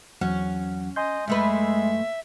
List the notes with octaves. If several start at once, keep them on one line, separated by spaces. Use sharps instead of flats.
E2 F#3 C#4 F#5
D#5 G#5 C6 G6
F#2 G#3 A3 B4 E5